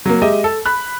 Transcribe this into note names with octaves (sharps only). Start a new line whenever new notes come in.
F#3 A#3
G#3 G4 D#5 E5
A4
B5 F#6